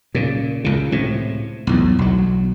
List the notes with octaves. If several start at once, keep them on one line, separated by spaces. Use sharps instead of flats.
A#2 C#3
C#2 C#3
A2 C3
B1 E2 A2
B1 F#3